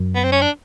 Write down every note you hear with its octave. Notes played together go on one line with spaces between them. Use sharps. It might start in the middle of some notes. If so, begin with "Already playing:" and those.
Already playing: F#2
B3
C4
C#4
D4